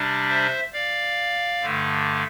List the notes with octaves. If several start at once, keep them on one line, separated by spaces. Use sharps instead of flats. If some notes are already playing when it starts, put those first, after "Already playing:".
Already playing: C3 G3 D4
C5 E5
D5 F5
G2 D3 A3